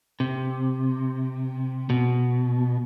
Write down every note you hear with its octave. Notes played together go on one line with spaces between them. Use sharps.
C3
B2